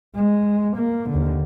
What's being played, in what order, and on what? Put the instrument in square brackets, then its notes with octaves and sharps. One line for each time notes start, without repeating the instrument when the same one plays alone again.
[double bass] G#3
A#3
D#2 D3